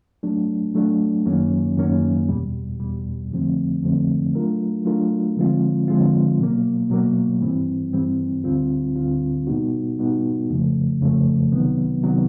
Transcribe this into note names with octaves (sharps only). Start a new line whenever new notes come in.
F#3 A3 D4
F#3 A3 D4
F#2 D#3 F#3 A#3 C#4
F#2 D#3 F#3 A#3 C#4
E2 B2 G3
E2 B2 G3
F2 D3 F3 A3 C4
F2 D3 F3 A3 C4
F#3 A3 D4 F4 A#4
F#3 A3 D4 F4 A#4
D3 F3 G#3 C4 F4
D3 F3 G#3 C4 F4
B2 F#3 A#3
B2 F#3 A#3
G2 E3 G3 C4
G2 E3 G3 C4
D2 D3 G3 C4 F4
D2 D3 G3 C4 F4
B2 G3 B3 D#4 F#4
B2 G3 B3 D#4 F#4
F2 C#3 F3 A3
F2 C#3 F3 A3
C2 C3 D#3 F#3 B3
C3 D#3 F#3 B3